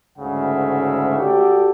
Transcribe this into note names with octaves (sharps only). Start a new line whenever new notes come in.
D2 G#2 C#3 E5 F#5
F#4 G4 A4 D5 G5